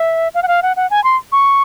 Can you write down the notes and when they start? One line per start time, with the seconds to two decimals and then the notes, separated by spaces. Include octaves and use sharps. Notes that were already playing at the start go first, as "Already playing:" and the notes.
Already playing: E5
0.34 F5
0.43 F#5
0.48 F5
0.63 F#5
0.76 F#5
0.90 G#5
1.04 C6
1.32 C#6